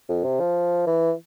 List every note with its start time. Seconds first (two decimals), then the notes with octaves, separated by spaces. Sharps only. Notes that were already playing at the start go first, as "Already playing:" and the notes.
0.09 F2
0.24 C3
0.40 F3
0.87 E3